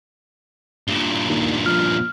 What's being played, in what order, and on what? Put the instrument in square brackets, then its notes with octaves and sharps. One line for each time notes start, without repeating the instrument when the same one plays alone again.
[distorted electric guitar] G2 A#2 [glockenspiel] E7 G7
[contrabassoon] D#2
[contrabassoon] F3 [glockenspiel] F6